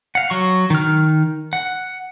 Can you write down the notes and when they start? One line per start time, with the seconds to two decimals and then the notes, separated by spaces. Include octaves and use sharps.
0.15 F5 F#5
0.30 F#3 C#6
0.70 D#3 F6
1.53 F#5